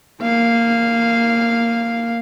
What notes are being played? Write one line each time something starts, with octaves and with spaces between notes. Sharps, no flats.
A#3 F5